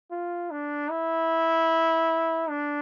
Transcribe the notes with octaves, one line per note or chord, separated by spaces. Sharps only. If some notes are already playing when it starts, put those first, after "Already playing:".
F4
D4
E4
D4